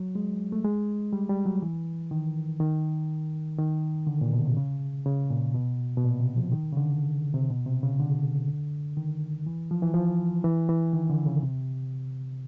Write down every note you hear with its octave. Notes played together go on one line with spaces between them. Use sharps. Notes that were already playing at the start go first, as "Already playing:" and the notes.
Already playing: F#3
G#3
A3
G#3
G3
G3
F#3
E3
D#3
D#3
D#3
D3
A#2
B2
C3
C#3
C#3
A#2
B2
B2
A#2
C3
F3
D#3
C#3
D3
C3
B2
C3
C#3
D3
D#3
E3
F3
E3
F3
E3
E3
D#3
D3
C#3
C3